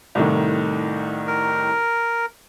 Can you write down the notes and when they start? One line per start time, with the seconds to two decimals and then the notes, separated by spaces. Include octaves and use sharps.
0.15 C2 A2 D#3
1.27 A#4